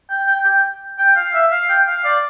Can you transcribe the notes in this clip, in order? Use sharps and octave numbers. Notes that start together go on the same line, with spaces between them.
G5
G5
G5
G5
F5
E5
F5
G5
F5
D5